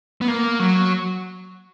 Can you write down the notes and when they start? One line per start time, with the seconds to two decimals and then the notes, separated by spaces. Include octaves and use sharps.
0.21 B3
0.28 A#3
0.59 F#3